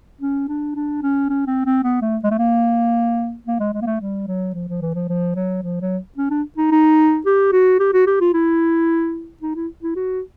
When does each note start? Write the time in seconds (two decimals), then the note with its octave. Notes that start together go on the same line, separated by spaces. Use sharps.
0.21 C#4
0.48 D4
0.75 D4
1.03 C#4
1.29 C#4
1.47 C4
1.66 C4
1.83 B3
2.01 A3
2.24 G#3
2.31 A3
2.38 A#3
3.47 A#3
3.60 G#3
3.74 G#3
3.82 A#3
3.87 A3
4.01 G3
4.28 F#3
4.54 F3
4.68 F3
4.81 E3
4.95 F3
5.09 F3
5.36 F#3
5.63 F3
5.81 F#3
6.18 C#4
6.30 D4
6.58 D#4
6.71 D#4
7.26 G4
7.52 F#4
7.80 G4
7.93 F#4
8.07 G4
8.21 F4
8.34 E4
9.42 D#4
9.55 E4
9.83 E4
9.96 F#4